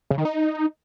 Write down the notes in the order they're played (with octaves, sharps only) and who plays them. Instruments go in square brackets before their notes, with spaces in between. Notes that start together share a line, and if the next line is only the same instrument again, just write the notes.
[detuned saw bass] C#3
D#3
D#4